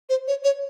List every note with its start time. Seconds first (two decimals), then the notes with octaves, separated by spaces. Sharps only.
0.09 C5
0.28 C#5
0.44 C#5